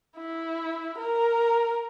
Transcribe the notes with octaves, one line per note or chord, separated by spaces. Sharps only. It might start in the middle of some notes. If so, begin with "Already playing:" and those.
E4
A#4